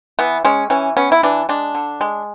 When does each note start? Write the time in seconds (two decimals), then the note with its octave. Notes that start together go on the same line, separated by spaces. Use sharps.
0.19 E3 B3
0.45 G#3 C#4
0.70 E3 C#4
0.97 B3 C#4
1.12 E4
1.23 E3 D4
1.49 G#3 D4
1.75 D3
2.01 G#3